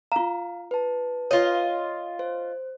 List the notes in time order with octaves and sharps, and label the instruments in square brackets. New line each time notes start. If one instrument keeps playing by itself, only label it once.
[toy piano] F4 A#5 [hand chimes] F5
[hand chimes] B4 A5
[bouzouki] F4 D#5 [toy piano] C#5
[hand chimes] C5